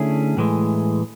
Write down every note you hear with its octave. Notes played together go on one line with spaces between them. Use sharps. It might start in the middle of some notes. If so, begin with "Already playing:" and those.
Already playing: D3 A3 C#4 E4 G#4
A2 E3 G#3